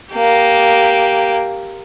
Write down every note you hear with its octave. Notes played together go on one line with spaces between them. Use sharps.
A#3 G4